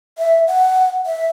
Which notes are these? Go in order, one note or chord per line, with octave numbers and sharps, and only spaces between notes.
E5
F#5
E5